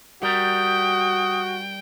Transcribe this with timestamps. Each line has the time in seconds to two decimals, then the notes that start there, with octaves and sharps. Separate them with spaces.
0.23 G3 F#4 A#4 G5 D#6